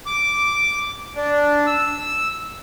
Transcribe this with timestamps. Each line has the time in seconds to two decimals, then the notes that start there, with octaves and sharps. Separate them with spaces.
0.06 D6
1.16 D4
1.67 E6